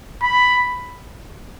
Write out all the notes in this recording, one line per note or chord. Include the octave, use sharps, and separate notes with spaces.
B5